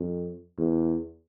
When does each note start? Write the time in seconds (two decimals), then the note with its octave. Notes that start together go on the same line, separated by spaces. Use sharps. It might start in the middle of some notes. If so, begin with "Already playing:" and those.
Already playing: F2
0.58 E2